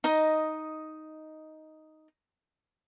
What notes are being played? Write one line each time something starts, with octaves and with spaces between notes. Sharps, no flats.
D#4 D#5